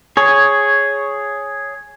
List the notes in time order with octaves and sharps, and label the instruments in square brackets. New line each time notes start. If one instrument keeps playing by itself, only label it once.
[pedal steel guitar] G#4 C#5